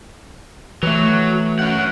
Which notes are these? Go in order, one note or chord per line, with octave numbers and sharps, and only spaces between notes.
E3 F#3 A3
C#4 F#5